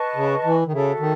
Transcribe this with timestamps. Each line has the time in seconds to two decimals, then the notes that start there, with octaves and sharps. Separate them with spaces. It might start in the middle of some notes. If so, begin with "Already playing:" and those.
Already playing: B4 D#5 A5 C#6
0.15 C#3
0.44 E3
0.66 D#3
0.72 C#3 F#4 A4 E5
0.99 D#3